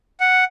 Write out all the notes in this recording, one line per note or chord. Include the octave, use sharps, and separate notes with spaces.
F#5